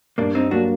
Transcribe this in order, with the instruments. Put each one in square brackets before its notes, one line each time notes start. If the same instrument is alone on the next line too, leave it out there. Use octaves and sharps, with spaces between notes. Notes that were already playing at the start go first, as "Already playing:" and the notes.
[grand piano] G2 [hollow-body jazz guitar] A#3 D4
[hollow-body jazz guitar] C4 D#4
[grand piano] F#3 A#3 [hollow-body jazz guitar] D4 F#4